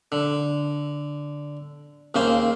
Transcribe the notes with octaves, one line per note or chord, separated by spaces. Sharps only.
D3
D#2 C#3 A#3 C5